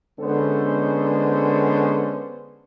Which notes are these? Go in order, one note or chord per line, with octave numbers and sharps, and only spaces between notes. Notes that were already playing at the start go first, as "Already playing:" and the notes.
D3 G#3 B3 C#4 A4 C5